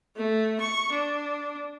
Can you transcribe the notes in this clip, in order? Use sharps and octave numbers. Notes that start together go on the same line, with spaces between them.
A3
C#6
D4